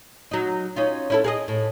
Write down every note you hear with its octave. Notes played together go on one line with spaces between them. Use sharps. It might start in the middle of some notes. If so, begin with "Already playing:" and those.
F#3 D#4
C#4 D#4 F4
C#4 E4 A4
G#4 A#4 D#5
A2